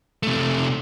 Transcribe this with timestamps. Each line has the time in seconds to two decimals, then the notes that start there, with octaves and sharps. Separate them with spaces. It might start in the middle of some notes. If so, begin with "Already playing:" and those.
0.23 C3 A3